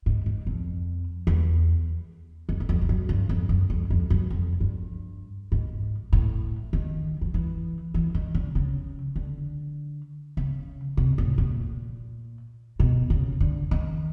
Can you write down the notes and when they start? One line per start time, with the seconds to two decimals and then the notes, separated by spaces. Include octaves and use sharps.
0.06 G#2
0.26 G#2
0.47 F2
1.27 E2
2.49 F2
2.60 E2
2.69 F2
2.81 F2
2.89 F#2
3.09 G2
3.29 F2
3.49 F#2
3.70 F2
3.90 F2
4.10 F#2
4.30 F2
4.60 G2
5.52 G#2
6.13 A2
6.73 D#3
7.21 F3
7.34 E3
7.94 E3
8.14 D#3
8.35 D3
8.55 C#3
9.16 D3
10.37 C#3
10.97 C3
11.18 A2
11.38 A#2
12.80 B2
13.10 C#3
13.40 D3
13.71 D#3